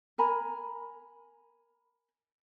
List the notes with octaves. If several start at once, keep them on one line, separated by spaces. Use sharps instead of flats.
A#4 G#5 A#5 B5